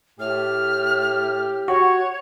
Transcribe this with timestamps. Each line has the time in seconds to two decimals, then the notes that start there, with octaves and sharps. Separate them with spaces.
0.20 A2 G4 F6
1.68 F#4 C#5